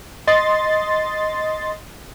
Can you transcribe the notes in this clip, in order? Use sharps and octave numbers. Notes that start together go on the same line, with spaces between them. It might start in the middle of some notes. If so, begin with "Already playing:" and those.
D#5 C6 A6